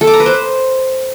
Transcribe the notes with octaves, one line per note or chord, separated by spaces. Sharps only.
A4
D6
A#5
B4
C5